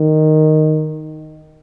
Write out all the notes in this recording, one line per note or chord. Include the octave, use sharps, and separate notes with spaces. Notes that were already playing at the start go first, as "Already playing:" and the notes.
Already playing: D#3